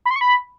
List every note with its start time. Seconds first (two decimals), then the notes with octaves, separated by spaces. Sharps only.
0.06 B5
0.11 C6
0.16 C#6
0.21 B5